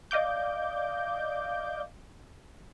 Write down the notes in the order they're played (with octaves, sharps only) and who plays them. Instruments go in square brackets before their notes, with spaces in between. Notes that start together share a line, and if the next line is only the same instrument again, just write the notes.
[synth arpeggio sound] D5 D#5 F5 D6 G6